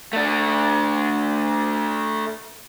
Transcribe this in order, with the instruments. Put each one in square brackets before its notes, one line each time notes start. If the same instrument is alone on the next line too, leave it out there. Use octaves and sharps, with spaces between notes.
[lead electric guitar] A3 D4